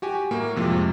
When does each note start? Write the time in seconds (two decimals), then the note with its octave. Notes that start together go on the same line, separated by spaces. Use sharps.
0.02 F#4 G4 G#5
0.31 A2 A#3 C#6
0.56 F2 C3 F3 G#3 F4